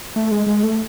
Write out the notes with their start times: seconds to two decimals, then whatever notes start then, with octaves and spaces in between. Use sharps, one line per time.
0.16 A3
0.31 G#3
0.47 G#3
0.63 A3